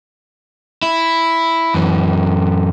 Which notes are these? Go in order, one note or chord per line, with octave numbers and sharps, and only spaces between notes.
E4
F#2 E3